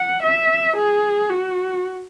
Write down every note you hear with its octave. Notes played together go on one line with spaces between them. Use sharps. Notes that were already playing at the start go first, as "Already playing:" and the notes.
Already playing: F#5
E5
G#4
F#4